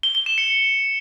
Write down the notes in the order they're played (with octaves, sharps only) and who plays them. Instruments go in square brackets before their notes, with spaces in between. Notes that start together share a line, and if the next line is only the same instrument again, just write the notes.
[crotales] G7
G7
E7
C#7